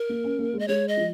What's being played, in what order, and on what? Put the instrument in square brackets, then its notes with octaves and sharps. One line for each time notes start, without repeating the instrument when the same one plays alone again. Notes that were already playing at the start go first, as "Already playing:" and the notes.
Already playing: [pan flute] A#4
[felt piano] A#3
C#4
A#3
G#3
[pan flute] D#5
[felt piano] G#3 [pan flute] C#5
[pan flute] D#5
[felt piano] F3